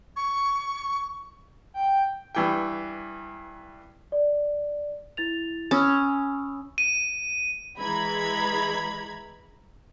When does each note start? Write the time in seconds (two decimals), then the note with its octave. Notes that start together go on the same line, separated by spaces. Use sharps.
0.16 C#6
1.74 G5
2.35 G2 E3 G5
4.12 D5
5.17 E4 A6 F7
5.71 C#4 B5 D#6 E6
6.78 D#7
7.78 E3 G#3 A#5 B5 G#6